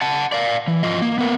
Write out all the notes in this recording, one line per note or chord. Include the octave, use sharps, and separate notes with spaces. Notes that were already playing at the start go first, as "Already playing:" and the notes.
F#5 A5
D5 F5
E3
F3 F4 D#5
A#3
B3 A#4